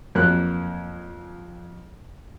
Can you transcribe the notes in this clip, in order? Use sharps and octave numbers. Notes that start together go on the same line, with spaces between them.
F2 F#3 A#3 F#6